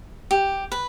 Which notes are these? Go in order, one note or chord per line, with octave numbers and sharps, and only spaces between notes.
G4
B4